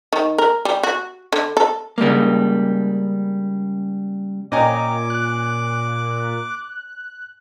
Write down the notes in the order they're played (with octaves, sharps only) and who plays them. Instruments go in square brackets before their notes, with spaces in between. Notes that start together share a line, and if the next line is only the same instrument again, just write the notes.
[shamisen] D#3
A#4
G3
F#4
D3
A4
[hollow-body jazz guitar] C#3 G3 G#3 A#3
[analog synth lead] A#2 [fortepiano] C#4 G#5 [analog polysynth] D#5 G5 A#5 [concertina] D6
[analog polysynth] F#6